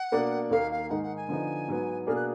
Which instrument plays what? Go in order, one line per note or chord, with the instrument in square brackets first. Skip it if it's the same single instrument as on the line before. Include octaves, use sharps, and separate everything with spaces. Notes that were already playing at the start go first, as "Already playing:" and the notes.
Already playing: [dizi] F#5
[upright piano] B2 A#3 D4
[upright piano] D#2 D#3 A#3 [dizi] F5
[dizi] F5
[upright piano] G#2 D#3 G#3 D#4 G#4 [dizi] F#5
[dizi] F#5
G#5
[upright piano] D3 F3 B3 D#4
G#2 F#3 B3
[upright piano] B2 A#3 D4 G#4 [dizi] F6
[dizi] F#6